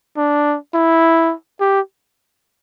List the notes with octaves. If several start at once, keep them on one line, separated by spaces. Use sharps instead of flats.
D4
E4
G4